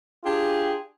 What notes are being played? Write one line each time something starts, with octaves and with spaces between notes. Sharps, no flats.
D4 F4 G4 G#4